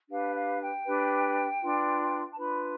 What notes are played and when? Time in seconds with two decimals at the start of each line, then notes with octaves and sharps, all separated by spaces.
0.10 D4 G4 B4 F5
0.34 F5
0.60 G5
0.85 D4 G4 B4
1.62 D4 F4 B4
2.30 A5
2.37 D4 F4 B4 B5